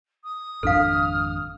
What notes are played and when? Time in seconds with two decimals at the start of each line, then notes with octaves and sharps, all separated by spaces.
0.23 D#6
0.63 G#1 F2 D4 A4 F5 F6